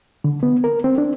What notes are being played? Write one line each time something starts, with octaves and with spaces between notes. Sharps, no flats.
D3
B3
A#4
C4
D4